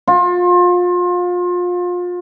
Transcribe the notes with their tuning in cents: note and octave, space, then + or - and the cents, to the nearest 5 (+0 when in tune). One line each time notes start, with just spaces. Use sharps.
F4 +30